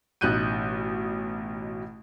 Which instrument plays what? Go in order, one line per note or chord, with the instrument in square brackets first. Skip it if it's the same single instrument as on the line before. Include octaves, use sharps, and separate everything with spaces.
[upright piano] A1 B2 D#4 F#6 G6 D#7